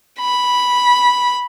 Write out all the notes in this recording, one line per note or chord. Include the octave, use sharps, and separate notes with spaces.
B5